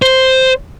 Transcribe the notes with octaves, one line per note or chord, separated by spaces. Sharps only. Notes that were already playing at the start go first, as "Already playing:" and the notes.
C5